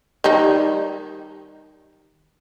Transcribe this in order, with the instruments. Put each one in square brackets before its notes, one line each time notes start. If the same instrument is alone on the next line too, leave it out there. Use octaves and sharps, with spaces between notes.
[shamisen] D#3 G3 D#4